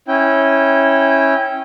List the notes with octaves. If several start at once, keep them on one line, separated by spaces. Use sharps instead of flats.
C#4 E4 G5